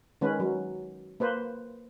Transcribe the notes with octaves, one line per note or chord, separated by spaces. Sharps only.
D#3 G#3 C#4 B4
F#3
A#3 B4 C5